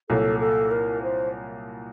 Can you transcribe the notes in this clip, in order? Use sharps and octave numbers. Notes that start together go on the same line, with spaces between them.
C2 A#2 F#3 A4
A4
A#4
C5